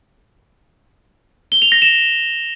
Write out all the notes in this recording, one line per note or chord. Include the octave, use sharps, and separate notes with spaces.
G7
F7
A#6
E7